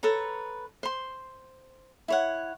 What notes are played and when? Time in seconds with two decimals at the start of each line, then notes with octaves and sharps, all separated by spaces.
0.03 A4 B4 C#5 A#5
0.83 C5 C6
2.08 E4 C#5 F#5